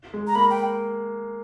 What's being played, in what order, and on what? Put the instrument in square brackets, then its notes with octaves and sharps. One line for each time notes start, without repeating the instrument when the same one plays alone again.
[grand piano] G#3
[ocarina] A#5
[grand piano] A#3 [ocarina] B5
[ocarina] G5